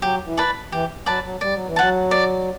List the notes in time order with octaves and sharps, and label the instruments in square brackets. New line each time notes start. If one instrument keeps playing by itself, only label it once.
[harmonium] F#3 [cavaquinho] G4
[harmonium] E3
[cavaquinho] B4 D5 A5
[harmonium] E3 [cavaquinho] G4
[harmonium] F#3 [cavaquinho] B4 D5 A5
[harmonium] F#3
[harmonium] G3 [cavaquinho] D5
[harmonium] F#3
E3
[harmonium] F#3 [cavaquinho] F#5 A5
[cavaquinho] D5